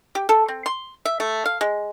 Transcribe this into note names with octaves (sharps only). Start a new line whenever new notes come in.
G4
A4
C4
C6
E5
A3
F5
G#3